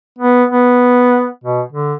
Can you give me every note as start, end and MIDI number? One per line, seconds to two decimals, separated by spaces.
0.19 0.44 59
0.51 1.27 59
1.44 1.61 47
1.72 1.94 50